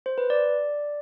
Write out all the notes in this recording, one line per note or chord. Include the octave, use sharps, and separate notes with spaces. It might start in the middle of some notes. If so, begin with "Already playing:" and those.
C5
B4
D5